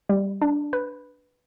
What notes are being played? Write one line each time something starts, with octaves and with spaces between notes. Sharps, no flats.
G3
D4
B4